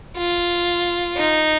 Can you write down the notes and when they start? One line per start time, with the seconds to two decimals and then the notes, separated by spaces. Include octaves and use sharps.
0.17 F4
1.17 D#4